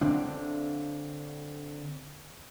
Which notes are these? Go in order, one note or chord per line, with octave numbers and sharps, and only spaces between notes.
D3 C4 D4